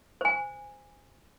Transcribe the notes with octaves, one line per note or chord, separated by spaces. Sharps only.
C5 G#5